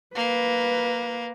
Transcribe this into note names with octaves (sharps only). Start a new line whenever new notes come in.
A#3 B4